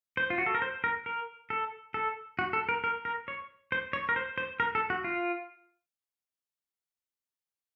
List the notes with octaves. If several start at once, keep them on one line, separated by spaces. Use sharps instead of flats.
C5
F4
F#4
A4
A#4
C5
A#4
A#4
A4
A4
F#4
A4
A#4
A#4
A#4
C#5
C5
C#5
A#4
C5
C5
A#4
A4
F#4
F4